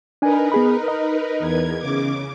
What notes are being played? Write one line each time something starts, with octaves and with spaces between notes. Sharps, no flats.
D4 D#4 A#4 B4 G#5
B3 G#4 B5
D#5
E2 G#6
C#3 D6